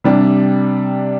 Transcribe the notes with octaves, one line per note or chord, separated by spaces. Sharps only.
C3 G3 D4